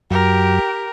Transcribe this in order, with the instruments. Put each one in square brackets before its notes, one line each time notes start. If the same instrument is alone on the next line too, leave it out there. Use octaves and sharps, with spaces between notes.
[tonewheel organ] F#2 F#3 [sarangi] G4 [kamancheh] A#4